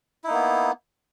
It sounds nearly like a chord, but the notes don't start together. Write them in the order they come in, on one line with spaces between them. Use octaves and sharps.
E4 D#4 A#3 B3